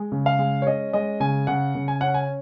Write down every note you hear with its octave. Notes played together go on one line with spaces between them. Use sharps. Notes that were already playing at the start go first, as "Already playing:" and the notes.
Already playing: G#3
C#3
F5
G#3
C#5
C#4 D#5
G#3 D#5
C#3 G#5
C#3 F#5
C#3
G#5
C#4 F#5
G#5